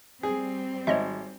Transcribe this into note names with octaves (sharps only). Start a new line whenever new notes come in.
G3 C4 G#4
G#1 C#5 D#5 E5